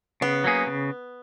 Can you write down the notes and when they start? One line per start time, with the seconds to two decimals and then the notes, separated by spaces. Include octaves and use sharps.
0.21 C#3 B3
0.44 F#3 A#3 C#4 G#4
0.67 C#3